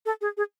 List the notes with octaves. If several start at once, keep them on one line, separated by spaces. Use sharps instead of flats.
A4
G#4
G#4